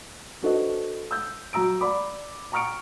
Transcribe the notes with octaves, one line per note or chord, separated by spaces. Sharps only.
D4 F#4 A4 B4 C5 D#5
E6 G6
F#3 F#4 A#5 E6 D7
D5 B5 D6
G5 A#5 C#6 F6 C#7 D7